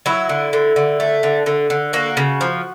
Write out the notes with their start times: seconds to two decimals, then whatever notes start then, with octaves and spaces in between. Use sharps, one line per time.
0.06 F#3 E4
0.29 D3
0.53 D3
0.76 D3
1.00 A3
1.23 D3
1.46 D3
1.70 D3
1.93 A#3 F#4
2.17 C#3
2.41 F3